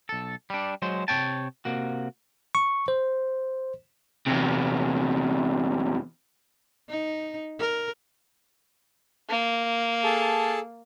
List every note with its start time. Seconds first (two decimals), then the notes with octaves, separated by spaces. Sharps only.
0.09 B1 A4
0.50 G3 D4
0.82 F#3 G#3 C5
1.08 C3 C#5 G5 A5
1.65 C3 A#3 F#4
2.55 C#6
2.88 C5
4.27 E2 C3
6.89 D#4
7.59 A#4
9.30 A#3
10.04 G#4 A4 A5